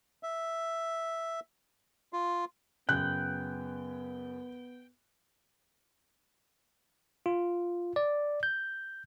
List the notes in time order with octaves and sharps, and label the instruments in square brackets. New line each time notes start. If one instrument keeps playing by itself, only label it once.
[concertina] E5
F4
[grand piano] F#2 C#3 [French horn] B3 [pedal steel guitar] G5 [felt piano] F#6
[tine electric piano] F4
D5
G6